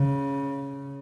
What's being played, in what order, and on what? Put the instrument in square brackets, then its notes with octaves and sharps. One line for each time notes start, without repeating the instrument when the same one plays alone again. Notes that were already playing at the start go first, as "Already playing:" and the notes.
Already playing: [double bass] C#3